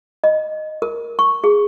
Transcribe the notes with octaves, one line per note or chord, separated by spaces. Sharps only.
D#5
A#4
C#6
G#4